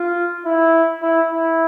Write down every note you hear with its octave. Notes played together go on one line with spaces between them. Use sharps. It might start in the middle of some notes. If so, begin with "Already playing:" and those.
Already playing: F4
E4
E4
E4